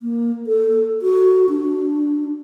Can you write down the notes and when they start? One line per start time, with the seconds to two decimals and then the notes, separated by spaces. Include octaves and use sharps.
0.02 A#3
0.47 A4
1.02 F#4
1.49 D4